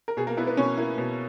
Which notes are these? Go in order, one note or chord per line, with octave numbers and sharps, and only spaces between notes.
A#4
B2 G#4
A#3 A#4
A#3 B3 E4 B4
B3 B4
B2 C#4 C#5
A#3 E4
B2